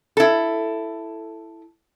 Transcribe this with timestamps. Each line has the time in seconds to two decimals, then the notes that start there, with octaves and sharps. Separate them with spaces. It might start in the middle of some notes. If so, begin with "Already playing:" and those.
0.17 E4 A4